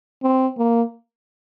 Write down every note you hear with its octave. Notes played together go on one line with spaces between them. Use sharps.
C4
A#3